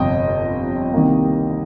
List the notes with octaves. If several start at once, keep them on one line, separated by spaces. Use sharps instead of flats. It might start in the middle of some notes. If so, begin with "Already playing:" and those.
Already playing: G1 F2 C3 D#5 G5
C2 C3 D#3 A#3